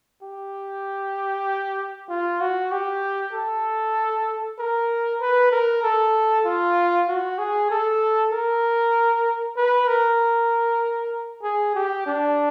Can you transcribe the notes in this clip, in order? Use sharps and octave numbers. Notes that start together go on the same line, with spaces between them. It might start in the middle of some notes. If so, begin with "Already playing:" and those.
G4
F4
F#4
G4
A4
A#4
B4
A#4
A4
F4
F#4
G#4
A4
A#4
B4
A#4
G#4
G4
D4